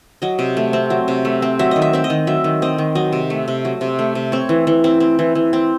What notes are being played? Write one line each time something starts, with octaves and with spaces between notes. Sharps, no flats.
F#3 D#5
C3
A3
C4
F#3
C3
A3
C4
F#3 E5
D#3 D#5
E5
C4 E5
D#5
D#3
F#3 E5
D#3
C4 D#5
D#3
F#3 D#5
C3
A3
C3
F#3
C3
A3
C3
C4 C#5
E3
E3
C4
C4
E3
E3
C4